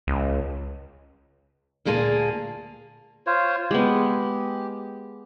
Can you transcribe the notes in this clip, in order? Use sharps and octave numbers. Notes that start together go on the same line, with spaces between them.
C#2
D2 A#2 A#3 G#4 A4 A5
F4 C5 C#5
G#3 B3 G4